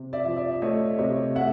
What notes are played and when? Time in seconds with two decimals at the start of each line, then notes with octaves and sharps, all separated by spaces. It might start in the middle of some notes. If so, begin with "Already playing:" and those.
Already playing: C3
0.13 D5 E5
0.25 F3
0.37 D5 E5
0.61 A3 C#5 D#5
0.99 C3 C#5 D#5
1.35 A3 E5 F#5